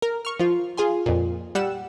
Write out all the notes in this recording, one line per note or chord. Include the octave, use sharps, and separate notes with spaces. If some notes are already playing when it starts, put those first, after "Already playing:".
A#4
C#6 F6
F3 F4
F4 G#4 G#5 C6
F2 A#2
G3 F#5 E6 E7